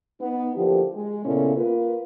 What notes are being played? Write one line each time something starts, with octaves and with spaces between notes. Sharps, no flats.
B3 D#4
D3 F3 A#3 E4 G4
G#3
A#2 C#3 B3 C#4 E4 A4
A#3 F4 B4